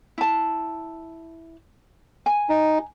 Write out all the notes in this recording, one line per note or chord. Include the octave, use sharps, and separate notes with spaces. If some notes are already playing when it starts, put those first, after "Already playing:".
E4 A5
G#5
D#4